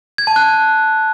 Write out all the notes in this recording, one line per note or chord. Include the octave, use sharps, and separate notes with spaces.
G#6
A5
F#6